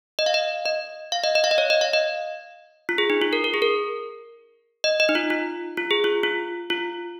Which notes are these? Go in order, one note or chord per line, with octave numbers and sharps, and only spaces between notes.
D#5
F5
D#5
D#5
F5
D#5
D#5
F5
D#5
C#5
D#5
F5
D#5
F4
G#4
D#4
F4
A#4
A#4
G#4
A#4
D#5
D#5
D#4
F4
F4
F4
G#4
F4
F4
F4